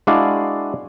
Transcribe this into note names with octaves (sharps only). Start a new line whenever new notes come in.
G#3 D4 E4 F#4 D5 F5